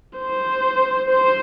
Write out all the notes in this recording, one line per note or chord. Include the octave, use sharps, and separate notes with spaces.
C5
C5